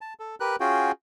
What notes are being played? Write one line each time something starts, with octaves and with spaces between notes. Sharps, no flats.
A5
A4
G4 A#4 B4 F#6
C#4 F4 F#4 G#4 G5